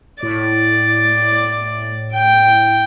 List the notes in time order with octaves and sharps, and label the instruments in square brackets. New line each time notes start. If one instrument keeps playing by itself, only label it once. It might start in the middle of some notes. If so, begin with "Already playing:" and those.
[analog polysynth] A2 [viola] D5
[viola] G5